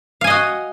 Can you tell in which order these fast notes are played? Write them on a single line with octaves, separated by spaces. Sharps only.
F5 G#5 D#5 F#4